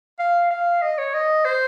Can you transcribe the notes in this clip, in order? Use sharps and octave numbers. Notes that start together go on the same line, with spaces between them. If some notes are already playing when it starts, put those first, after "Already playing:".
F5
F5
D#5
C#5
D#5
C5